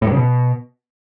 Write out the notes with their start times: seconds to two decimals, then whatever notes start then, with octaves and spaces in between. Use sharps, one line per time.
0.02 A2
0.07 G2
0.12 C#3
0.17 B2